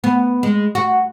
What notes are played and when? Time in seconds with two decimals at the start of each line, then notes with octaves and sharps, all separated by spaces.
0.04 B3
0.43 G#3
0.75 F#4